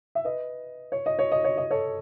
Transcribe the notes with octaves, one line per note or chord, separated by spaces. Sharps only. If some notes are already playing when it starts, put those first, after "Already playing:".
E5
B4 D#5
C#5
D#5
C#5
D#5
C#5
D#5
A4 C#5